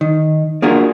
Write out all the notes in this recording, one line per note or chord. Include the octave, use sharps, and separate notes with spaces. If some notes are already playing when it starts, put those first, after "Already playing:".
D#3
A#3 D4 F4 F#4 G#4 A#4